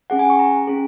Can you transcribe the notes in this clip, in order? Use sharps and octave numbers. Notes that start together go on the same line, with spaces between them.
C#4 G#4 F#5
G#5
C#6
A#5
C#4 G#4